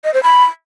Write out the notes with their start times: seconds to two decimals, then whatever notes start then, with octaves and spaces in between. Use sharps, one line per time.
0.04 D#5
0.14 C5
0.23 B5